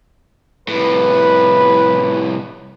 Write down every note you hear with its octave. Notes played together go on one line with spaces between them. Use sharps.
C2 A2 B4